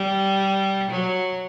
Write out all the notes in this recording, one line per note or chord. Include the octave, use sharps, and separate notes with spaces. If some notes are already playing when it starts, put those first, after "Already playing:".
Already playing: G3
F#3